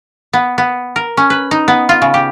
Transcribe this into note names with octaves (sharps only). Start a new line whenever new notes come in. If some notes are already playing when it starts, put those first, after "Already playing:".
B3
B3
A#4
C#4
B4
D#4
B3
F4
C#3
G4